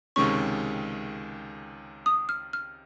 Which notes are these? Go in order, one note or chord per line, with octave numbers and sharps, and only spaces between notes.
C#2 C3 D#3 G#3 C#4 C#6
D#6
F6
F6